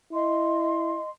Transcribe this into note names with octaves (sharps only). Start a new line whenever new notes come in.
E4 D#5 C6